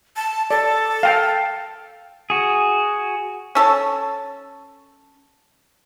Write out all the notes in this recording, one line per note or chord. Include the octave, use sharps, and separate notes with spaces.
A5
A4 D5
F5 G5 A5
F#4 G#4
C#4 A4 C#5 A5